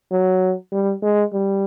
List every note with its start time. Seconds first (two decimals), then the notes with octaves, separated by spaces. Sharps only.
0.11 F#3
0.72 G3
1.02 G#3
1.33 G3